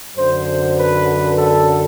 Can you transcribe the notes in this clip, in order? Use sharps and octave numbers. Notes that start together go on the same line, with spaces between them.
F#2 D3 C5
B4
A4